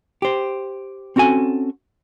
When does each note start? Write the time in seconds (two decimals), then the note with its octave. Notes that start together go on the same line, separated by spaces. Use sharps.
0.22 G4 C5
1.16 C4 C#4 F#4 A4 G#5